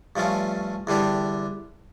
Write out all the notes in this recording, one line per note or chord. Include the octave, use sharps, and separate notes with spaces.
G2 F3 A3 C#4 F4
E2 D3 G3 D4 G4